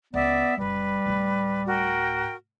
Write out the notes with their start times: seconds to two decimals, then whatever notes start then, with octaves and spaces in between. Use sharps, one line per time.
0.14 C#2 B3 D5 E5
0.58 F#1 A#2 G3 B4
1.06 D1 A2
1.66 F#4 A#4 G5